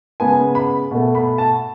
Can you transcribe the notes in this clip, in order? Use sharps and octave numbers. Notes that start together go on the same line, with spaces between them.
C#3 G#3 B3 G#5
B5
B2 A3
B5
A5